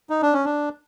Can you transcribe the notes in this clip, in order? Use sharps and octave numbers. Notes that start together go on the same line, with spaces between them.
D#4
D4
C#4
D4